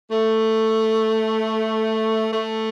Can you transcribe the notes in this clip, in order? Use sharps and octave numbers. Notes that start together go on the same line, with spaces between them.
A3
A3